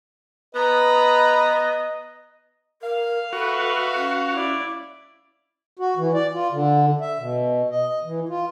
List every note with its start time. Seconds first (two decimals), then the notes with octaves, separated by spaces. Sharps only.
0.55 B3 B4 D#5 A#5
2.82 A#4 F5
3.33 F#4 A4 B4 E5
3.95 C#4
4.33 E4 D5
5.79 F#4
5.97 E3
6.14 D5
6.33 F4
6.52 D3
7.01 E5
7.19 B2
7.70 D#5
8.04 E3
8.29 F4